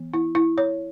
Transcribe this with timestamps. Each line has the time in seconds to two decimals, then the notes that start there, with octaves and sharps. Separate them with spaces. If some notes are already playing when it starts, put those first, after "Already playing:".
Already playing: E3 B3
0.14 E4
0.35 E4
0.58 C#5